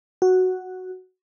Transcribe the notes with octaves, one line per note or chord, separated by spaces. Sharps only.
F#4